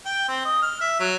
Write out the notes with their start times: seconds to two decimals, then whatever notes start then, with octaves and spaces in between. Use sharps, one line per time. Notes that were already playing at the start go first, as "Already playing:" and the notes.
0.05 G5
0.28 C4
0.45 D#5
0.62 F6
0.81 E5
1.00 F#3